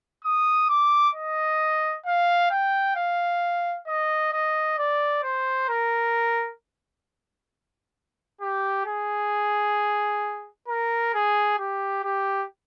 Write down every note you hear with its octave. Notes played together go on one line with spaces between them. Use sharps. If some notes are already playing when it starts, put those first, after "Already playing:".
D#6
D6
D#5
F5
G5
F5
D#5
D#5
D5
C5
A#4
G4
G#4
A#4
G#4
G4
G4